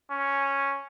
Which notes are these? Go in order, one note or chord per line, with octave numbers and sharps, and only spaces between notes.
C#4